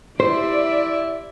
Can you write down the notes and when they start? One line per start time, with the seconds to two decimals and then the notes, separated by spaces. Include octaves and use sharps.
0.20 E4 G4 C5 D5 E5